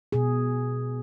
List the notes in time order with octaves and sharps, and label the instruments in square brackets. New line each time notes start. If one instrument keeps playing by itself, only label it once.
[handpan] B2 G#4